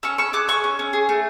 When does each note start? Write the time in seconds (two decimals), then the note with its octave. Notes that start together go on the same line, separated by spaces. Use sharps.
0.03 C#4 C#6 E6
0.18 C#4 C#6 E6
0.33 G#4 D6 F#6
0.48 G#4 C#6 E6
0.64 C#4
0.79 C#4
0.93 G#4
1.09 A3